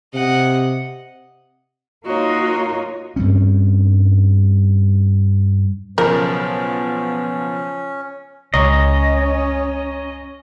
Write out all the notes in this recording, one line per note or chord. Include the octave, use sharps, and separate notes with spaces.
C3 D#5 F#5
A#3 D#4 F4 F#4 C#5 D#5
G2 G3 C4 C#4
B1 C#3 F3 B3 C#4 A#4
C#2 C#4 C#5 D#5 A#5 C#6